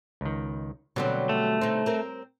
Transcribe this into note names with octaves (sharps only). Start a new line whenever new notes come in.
C#2 D#3
B2 D3 F#3 G3 C4
A3
C4 D#4
C4 A#4